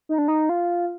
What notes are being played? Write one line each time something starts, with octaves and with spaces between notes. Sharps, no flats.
D#4
D4
D#4
F4